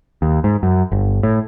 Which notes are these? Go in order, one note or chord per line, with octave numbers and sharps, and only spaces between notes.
D#2
G#2
F#2
G1
A2